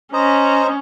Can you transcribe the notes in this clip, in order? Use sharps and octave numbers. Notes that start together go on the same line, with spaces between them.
C#4 C5 D#5 A#5